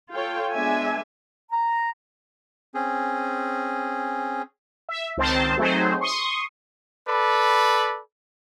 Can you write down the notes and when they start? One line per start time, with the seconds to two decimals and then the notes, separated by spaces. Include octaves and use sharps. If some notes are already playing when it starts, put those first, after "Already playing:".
0.13 F4 A4 C#5 G5
0.53 G#3 B3 D4 E5 G#5
1.52 A#5
2.74 C4 C#4 G#4
4.89 E5
5.17 C#2 D#3 C4 C5 A5
5.57 F#3 A3 C4 D#4 G#4 C5
6.01 C6 C#6 D#6
7.08 A4 B4 D5 B5